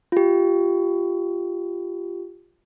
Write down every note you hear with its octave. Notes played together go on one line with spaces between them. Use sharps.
F4 G4